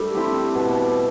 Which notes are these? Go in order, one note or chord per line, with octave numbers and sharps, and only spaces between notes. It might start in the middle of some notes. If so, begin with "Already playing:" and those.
Already playing: G3 A3 D4 A4
C4 E4 G4
B2